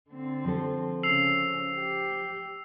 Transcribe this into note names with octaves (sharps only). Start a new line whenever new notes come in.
D3 C4
F3 A4
C#3 E6 C7 F7
G4